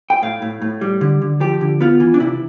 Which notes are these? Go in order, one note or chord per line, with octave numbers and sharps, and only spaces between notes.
G5
A2 F5
A2
A2
G3
D3
D3
F3 G4
D3
B3 F4
E3
D4
C3 E4